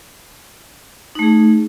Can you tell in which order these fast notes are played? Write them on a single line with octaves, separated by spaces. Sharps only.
D#4 A3 G#4